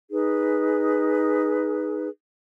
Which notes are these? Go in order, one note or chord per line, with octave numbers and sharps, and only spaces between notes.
D#4 G#4 B4